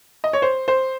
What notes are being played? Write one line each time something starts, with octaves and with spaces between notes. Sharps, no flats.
D#5
C#5
C5
C5